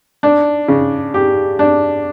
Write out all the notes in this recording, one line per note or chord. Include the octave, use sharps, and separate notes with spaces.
D4
C#3
G4
D4